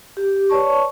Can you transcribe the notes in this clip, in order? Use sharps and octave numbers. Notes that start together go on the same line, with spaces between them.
G4
B4 C#5 D5 A5 C#6